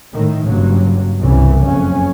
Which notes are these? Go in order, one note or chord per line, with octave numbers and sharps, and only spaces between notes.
A2 D#3
F#1 G2 F#3
G1 C2 C#3 E3
F#1 F2 C#4